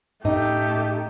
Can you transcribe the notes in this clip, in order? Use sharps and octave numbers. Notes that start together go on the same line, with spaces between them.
A2 A3 C#4 D#4 G4